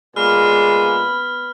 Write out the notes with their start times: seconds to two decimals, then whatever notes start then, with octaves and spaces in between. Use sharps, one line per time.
0.16 A#2 G#3 B3 B5 F6